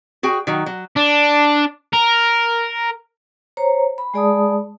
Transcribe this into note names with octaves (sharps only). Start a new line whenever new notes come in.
F#4 G#4 G5
D#3 F#3
F#3
D4
A#4
C5 C#5 A#5
B5
G#3 G#4 D5 A5 B5 D#6